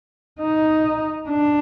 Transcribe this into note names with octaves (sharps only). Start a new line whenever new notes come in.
D#4
D4